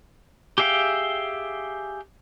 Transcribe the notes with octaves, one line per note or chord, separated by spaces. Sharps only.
G4 G#4 E5 F5 G5